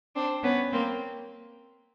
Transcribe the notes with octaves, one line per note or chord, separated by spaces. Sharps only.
C4 D4
B3 C#4
A#3 C4